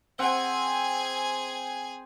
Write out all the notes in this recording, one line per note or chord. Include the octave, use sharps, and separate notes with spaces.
C4 G#4 F#5 G#5